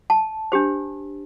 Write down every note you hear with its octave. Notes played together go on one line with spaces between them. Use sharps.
A5
D4 G4 C5